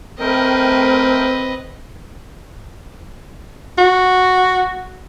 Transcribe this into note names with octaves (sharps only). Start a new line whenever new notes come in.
A3 C4 A#4 B4 D#5 G5
F#4